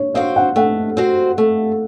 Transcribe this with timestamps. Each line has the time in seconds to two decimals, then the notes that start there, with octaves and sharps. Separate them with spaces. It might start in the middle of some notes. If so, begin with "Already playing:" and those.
Already playing: C#5
0.14 C4 F#4 C5 F5
0.36 F#5
0.56 A3 F#5
0.97 C4 F#4 C5
1.38 A3